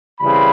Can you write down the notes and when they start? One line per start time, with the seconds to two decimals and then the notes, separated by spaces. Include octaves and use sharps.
0.21 C#3 E3 G3 C4 B5